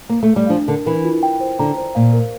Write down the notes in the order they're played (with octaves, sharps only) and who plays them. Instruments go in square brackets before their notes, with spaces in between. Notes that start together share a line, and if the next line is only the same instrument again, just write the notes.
[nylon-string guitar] A#3
A3
G3
[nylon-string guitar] F3 [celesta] D4
[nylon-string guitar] D3 [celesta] A#4
[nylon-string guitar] E3 [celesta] A#4
[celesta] F4
G5
C5
[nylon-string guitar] D3 [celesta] A#5
[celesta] C5
[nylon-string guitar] A#2 [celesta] F5
[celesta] A#4